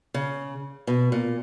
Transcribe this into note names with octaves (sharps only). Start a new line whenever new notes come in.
C#3
B2
A#2